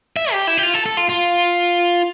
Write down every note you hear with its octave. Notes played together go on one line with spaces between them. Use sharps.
E5
G4
E4
G4
F4
A4
A4
F4
F4